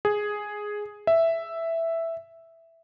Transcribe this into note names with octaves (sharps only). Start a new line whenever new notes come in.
G#4
E5